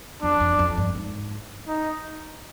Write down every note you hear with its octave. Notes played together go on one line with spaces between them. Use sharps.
F2 D4
F2
F2
G2
G#2
D#4